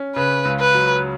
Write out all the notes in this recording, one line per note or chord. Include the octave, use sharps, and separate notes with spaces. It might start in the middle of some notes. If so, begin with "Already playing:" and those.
Already playing: C#4
C#3 B4
C#2
B4
F#3